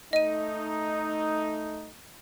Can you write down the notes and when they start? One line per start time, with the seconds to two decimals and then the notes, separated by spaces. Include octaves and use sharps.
0.13 A3 D#4 D#5 D#7